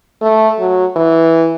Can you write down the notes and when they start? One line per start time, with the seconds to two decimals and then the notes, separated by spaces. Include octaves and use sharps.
0.21 A3
0.59 F#3
0.96 E3